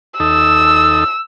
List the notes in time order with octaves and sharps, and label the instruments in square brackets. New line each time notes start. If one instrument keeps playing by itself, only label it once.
[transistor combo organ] D#2 D#4 A4 [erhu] E6